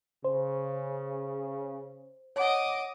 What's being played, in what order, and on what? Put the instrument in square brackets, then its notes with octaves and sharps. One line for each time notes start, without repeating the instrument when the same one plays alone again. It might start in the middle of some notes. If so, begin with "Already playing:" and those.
[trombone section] C#3 [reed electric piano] C5
[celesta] C#5 F#5 [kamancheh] D#5 D6